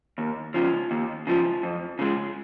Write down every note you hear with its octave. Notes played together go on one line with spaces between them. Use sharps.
D#2
C#3 F3
D#2
C#3 F3
F2
C#3 G#3